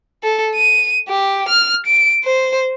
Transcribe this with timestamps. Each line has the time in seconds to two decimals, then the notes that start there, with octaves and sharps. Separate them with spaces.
0.23 A4
0.55 D#7
1.08 G4
1.49 F6
1.86 D7
2.24 C5